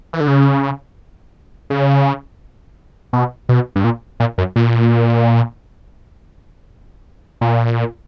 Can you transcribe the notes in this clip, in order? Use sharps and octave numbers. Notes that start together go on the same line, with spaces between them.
E3
D3
C#3
C#3
B2
B2
G2
A#2
A#2
F#2
A#2
A#2